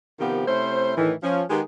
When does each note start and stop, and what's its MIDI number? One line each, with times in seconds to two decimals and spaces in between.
0.20 0.46 48
0.20 0.46 51
0.20 0.46 53
0.20 0.46 59
0.20 0.46 67
0.20 0.46 70
0.48 0.93 48
0.48 0.93 57
0.48 0.93 61
0.48 0.93 64
0.48 0.93 72
0.97 1.13 45
0.97 1.13 51
0.97 1.13 52
1.23 1.43 53
1.23 1.43 61
1.50 1.62 51
1.50 1.62 56
1.50 1.62 59
1.50 1.62 63
1.50 1.62 67
1.50 1.62 68